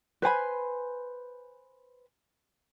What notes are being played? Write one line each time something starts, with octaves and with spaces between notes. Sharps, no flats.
B4 C5 G#5 B5